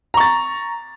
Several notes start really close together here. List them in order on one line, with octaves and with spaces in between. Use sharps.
A#5 C#6 A6